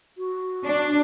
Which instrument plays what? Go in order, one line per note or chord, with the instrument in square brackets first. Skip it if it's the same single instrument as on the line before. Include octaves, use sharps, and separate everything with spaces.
[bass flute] F#4
[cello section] D4